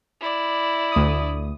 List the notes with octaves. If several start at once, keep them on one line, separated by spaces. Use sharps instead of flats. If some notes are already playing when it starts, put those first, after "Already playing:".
E4 D5
D2 D#6